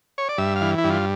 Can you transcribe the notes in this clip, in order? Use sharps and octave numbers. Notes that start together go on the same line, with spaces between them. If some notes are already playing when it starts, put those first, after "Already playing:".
C#5
D5
G2 E5
F5
E3
E4
G2
F4